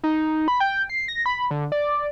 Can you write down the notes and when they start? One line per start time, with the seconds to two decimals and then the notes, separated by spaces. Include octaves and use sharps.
0.04 D#4
0.48 B5
0.60 G5
0.89 C7
1.08 A#6
1.26 B5
1.51 D3
1.72 D5